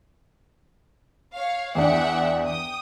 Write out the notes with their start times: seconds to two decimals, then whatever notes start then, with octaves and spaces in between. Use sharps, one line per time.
1.35 C#5 F5
1.75 E2 D4 E5 F#5 G5
2.45 G5 D#6